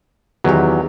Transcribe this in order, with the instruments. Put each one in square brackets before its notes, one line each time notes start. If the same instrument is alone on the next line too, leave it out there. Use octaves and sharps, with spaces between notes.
[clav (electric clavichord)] E2 F#3 [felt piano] D#3 G4